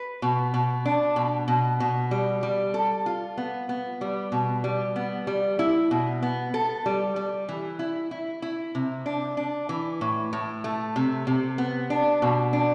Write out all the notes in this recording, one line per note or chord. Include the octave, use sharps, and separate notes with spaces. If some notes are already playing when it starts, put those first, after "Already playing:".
Already playing: B4
B2
B2
D4
B2
B2
B2
G3
G3
A4
F4
B3
B3
G3
B2
G3
B3
G3
E4
B2
B3
A4
G3
G3
E3
E4
E4
E4
C3
D4
D4
E3
A2
A2
A3
C3
C3
B3
D4
B2
D4